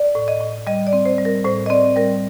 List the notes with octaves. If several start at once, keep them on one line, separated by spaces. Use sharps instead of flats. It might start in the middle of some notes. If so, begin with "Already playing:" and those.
Already playing: D5
A2
D#5
A2
G3 D#5
D5
C4
C5
G3
A#4
A2 C5
D#5
C4 D5
G3 A#4